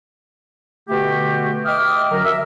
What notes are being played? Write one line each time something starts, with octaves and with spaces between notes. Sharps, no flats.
B2 D3 A3 F#4 G4
D#5 E5 G5 D6 D#6 F6
F#2 D3 F#3 A#4
E5